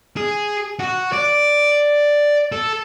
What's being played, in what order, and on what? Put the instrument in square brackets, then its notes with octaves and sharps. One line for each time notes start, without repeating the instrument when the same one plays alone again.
[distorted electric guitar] G#4
F#4
D5
A4